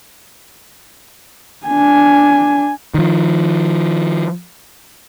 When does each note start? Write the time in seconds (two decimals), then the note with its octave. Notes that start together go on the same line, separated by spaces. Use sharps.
1.67 D4 G#5
2.94 D#3 F3